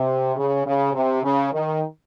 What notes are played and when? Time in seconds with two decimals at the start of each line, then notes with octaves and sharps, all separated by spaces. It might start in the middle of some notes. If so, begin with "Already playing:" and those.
Already playing: C3
0.36 C#3
0.65 C#3
0.93 C3
1.23 C#3
1.52 D#3